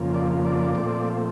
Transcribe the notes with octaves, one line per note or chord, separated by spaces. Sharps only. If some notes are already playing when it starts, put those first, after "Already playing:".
Already playing: F2 C#3 F3 A#3
D5
D5
A#2 F3 A3 C4